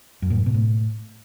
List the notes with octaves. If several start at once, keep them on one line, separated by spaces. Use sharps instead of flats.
F#2
A#2
G#2
B2
A2